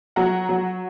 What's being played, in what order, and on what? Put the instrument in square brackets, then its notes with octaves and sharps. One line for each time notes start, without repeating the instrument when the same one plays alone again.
[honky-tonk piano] F#3 F#5 A#5
F#3